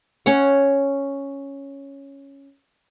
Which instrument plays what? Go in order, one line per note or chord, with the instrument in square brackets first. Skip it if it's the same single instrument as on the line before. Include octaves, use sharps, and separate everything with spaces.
[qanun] C#4 C#5 F#5